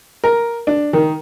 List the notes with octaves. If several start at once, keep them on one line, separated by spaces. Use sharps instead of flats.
A#4
D4
D#3